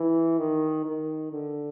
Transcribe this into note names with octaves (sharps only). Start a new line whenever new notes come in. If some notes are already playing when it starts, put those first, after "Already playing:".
Already playing: E3
D#3
D#3
D3